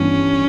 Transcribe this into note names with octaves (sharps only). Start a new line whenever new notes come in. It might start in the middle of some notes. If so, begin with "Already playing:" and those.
Already playing: G2 E3 B3 C#4 D4